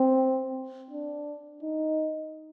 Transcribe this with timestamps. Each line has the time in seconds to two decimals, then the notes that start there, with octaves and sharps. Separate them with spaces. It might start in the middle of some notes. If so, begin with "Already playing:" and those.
Already playing: C4
0.91 D4
1.63 D#4